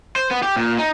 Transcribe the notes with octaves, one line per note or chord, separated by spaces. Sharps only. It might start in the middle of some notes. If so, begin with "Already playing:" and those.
C5
B3
G4
A#2
D#4